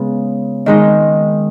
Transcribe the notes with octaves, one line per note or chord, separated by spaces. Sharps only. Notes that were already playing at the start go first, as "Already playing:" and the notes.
Already playing: C#3 G#3 B3
D#3 G#3 D#4